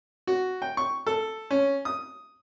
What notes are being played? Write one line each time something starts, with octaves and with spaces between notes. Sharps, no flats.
F#4
G5
C#6
A4
C#4
D#6